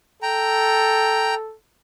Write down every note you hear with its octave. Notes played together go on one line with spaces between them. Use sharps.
A4 G5 A#5